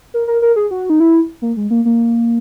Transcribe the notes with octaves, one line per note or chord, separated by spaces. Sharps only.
A#4
A#4
A#4
G#4
F#4
D#4
E4
A#3
G#3
A#3
A#3